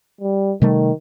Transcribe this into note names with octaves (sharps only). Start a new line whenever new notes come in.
G3
C3 D#3 G3 A3